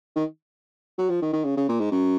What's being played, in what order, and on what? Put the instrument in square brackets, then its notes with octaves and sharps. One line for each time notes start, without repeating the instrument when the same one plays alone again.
[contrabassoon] D#3
F#3
F3
D#3
D#3
C#3
C#3
A#2
G#2
F#2